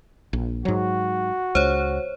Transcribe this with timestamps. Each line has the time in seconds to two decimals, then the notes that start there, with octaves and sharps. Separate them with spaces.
0.33 A#1
0.65 G#2 F#3 F#4
1.55 C#2 C5 C#5